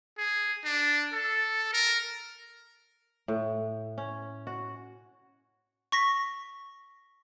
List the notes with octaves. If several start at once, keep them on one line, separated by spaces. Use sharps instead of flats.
G#4
D4
A4
A#4
A2
C#4
F#4
C#6 A#6 B6